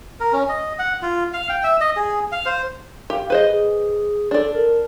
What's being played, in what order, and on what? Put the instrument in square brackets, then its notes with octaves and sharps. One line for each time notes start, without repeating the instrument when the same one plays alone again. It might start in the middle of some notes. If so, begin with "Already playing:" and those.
[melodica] A#4
C#4
D#5
F#5
F4
F5
G5
E5
D#5
G#4
F5
C5
[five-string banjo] G4 [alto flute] F5
[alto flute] G#4 [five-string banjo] B4 C5 D#5
[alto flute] G#4
[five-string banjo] D4 D5 [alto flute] A4
[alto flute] A#4